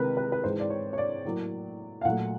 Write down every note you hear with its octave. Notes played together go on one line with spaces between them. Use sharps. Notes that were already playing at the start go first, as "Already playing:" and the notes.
Already playing: C3 D#3 G#3 A#4 B4
B4
B4
G#2 E3 G#3 C5
D5
C#5
C#5
D5
A2 F#3 A#3
F5
A#2 F#3 A3 F#5